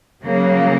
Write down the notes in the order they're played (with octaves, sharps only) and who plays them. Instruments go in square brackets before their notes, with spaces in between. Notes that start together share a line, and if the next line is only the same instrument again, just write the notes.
[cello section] C#3 F#3 A#3